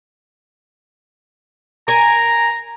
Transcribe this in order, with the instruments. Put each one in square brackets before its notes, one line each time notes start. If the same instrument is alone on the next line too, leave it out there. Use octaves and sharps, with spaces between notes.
[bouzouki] A#4 G#5 [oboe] A#5